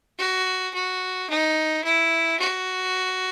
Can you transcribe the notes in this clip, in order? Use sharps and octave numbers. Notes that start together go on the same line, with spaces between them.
F#4
F#4
D#4
E4
F#4